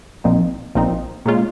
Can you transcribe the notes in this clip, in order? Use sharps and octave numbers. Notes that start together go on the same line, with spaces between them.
A#1 A#2 F3 C4 D#4
A#1 A#2 F3 C4 D#4
A#2 G#3 C#4 F4